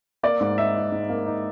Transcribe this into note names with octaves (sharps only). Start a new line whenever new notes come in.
A#3 D5
G#2
D#4 E5
D#4
G#2
A#3
D#4